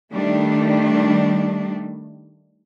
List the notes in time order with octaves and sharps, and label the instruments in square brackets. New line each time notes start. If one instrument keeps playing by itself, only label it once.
[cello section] D#3 G3 A3 D4